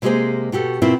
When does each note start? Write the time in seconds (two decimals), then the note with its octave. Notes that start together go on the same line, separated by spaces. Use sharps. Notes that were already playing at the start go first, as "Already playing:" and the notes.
0.02 C3 G#3 A#3 G4 G#4 C5
0.52 B2 F#4 G4 A4
0.82 B2 C4 E4 F4 A#4